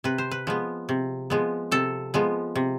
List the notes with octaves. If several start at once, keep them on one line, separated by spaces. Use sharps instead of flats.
C3 B4
C5
B4
F3 G#3 B3
C3
F3 G#3 B3
C3 A4
F3 G#3 B3
C3